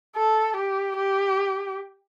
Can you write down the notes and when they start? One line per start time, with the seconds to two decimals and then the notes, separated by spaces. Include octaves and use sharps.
0.16 A4
0.56 G4
0.97 G4